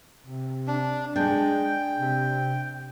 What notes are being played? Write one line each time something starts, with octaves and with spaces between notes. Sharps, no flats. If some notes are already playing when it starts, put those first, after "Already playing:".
C3
D4
G#3 D4 G5
C3